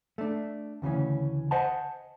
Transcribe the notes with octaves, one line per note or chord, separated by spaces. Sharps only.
A3 D4
D2 C#3 E3 C#4
C5 D#5 F#5 G#5 A5